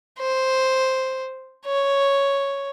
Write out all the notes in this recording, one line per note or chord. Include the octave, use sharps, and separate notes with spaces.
C5
C#5